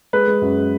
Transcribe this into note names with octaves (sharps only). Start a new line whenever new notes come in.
G#3 B4
G#3
F#2
G#3